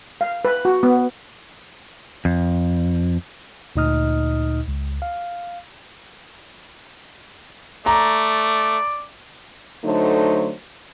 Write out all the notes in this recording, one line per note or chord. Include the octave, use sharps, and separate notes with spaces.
F5
B4
F#4
B3
F2
D2 A#2 D#4 D#5 D#6 F6
C#2
F5
A3 D5 A#5
D3 F#3 A3 D#4 C5